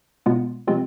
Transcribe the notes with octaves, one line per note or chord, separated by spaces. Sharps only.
B2 G#3 B3 F4
C3 F3 G#3 C4 F4